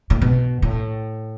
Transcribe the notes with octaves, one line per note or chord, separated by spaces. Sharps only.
A2
B2
A2